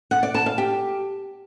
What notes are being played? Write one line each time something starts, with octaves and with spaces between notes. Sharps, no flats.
F#5
D5
A5
F5
G4